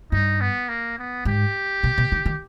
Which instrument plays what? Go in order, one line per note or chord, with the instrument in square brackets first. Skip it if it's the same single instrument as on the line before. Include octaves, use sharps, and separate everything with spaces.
[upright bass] G2 [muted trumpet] D#4
[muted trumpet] B3
A#3
B3
[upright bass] G#2 [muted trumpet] G4
[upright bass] B2
B2
D#3
D#3